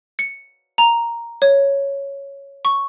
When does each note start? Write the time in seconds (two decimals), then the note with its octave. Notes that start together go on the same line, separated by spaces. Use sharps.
0.19 C#7
0.78 A#5
1.42 C#5
2.65 C#6